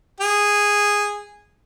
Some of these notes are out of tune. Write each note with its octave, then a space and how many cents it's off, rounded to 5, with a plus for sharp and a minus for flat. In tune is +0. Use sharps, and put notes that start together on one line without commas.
G#4 -10